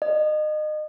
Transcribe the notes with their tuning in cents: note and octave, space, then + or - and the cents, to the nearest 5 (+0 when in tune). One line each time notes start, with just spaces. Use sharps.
D#5 -30